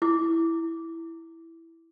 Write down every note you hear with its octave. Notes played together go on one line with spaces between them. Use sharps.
E4 D6